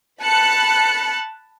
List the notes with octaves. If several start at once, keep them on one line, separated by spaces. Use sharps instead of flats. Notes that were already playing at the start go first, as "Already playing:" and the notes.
A5 B5 F#6 C#7